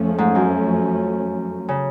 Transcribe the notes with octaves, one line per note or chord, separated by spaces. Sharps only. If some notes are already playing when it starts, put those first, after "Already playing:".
Already playing: F2 F3 A3 C#4
G#2
F#2
C#3